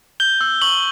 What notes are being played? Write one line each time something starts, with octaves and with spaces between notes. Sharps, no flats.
G6 G7
E6
C#6 F#7